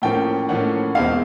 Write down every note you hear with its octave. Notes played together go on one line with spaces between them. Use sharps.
A2 F3 A#3 C#4 G5
A2 F3 A#3 C#4 F#5
E2 B2 G#3 C4 F5